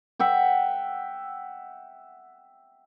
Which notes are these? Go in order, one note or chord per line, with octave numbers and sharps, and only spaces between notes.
E5 F#5 G5